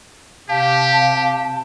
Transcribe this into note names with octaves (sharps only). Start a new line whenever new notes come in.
C3 G4 F5 A5